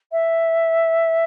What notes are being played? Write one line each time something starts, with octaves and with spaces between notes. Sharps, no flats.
E5